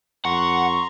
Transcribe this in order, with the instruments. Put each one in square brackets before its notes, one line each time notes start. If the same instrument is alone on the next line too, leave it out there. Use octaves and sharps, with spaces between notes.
[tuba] F2 [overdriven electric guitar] F#5 [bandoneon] A#5 C6 [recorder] C#6